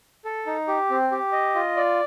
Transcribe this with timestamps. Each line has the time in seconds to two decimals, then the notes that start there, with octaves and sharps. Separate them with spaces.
0.25 A4
0.46 D#4
0.68 G4
0.90 C4
1.12 G4
1.32 D#5
1.55 F4
1.77 D5